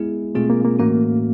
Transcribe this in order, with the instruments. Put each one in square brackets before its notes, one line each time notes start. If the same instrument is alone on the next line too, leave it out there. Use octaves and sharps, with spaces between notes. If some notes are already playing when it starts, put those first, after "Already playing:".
Already playing: [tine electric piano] G#3 B3 E4 G#4
[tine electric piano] B2 G#3 C4 F4 G#4 [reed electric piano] A3
[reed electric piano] A#3
A#3
[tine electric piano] A2 E3 A3 C#4 F#4 [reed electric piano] A#3